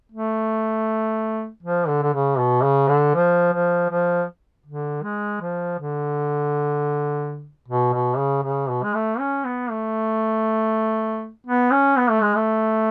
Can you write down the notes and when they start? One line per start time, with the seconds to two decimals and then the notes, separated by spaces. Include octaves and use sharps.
0.12 A3
1.63 F3
1.87 D3
2.02 D3
2.14 C#3
2.39 B2
2.63 C#3
2.88 D3
3.15 F3
3.52 F3
3.90 F3
4.66 D3
5.03 G#3
5.41 F3
5.79 D3
7.68 B2
7.93 B2
8.18 C#3
8.43 C#3
8.69 B2
8.83 G#3
8.94 A3
9.19 C#4
9.44 B3
9.70 A3
11.47 B3
11.71 C#4
11.97 B3
12.10 A3
12.22 G#3
12.36 A3